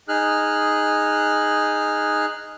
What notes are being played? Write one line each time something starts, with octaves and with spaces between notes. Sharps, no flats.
D#4 G#4 F6 F#6